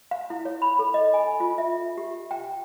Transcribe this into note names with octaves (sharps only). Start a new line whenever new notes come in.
F5
E4
C#5
B5
A4
D#5
G#5
F4
E5
G4
G5